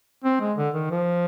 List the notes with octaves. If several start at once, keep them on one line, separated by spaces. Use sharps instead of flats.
C4
G#3
D3
D#3
F3